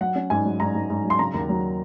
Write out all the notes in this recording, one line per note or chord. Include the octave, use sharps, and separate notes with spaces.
F#3 F#5
C#4
G#2 G#5
F#3
G#2 A#5
G#2
G#2
F#3
C6
C#3 A#5
D#2
F#3